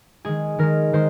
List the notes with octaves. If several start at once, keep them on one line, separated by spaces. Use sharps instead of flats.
D#3 G#3 G#4
D#3 G#3 A#4
D#3 G#3 C5